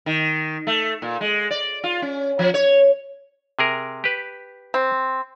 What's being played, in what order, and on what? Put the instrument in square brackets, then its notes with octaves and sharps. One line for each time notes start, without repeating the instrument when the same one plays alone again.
[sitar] D#3
A3
A#2
G#3
D5
F4
C#4
F3
C#5
[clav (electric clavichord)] C3 G#4 A#4
G4 B4
[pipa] C4